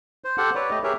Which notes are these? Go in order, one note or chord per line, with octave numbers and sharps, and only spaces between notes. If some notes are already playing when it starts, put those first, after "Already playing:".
C5
G4 A4 C5 F#5
B4 C#5 D5
A3 G4 D#5
G4 G#4 A#4 C#5 E5